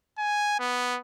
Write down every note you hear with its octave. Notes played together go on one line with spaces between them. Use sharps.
G#5
B3